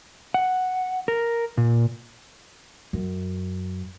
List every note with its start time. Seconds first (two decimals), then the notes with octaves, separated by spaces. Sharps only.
0.34 F#5
1.08 A#4
1.57 A#2
2.93 F#2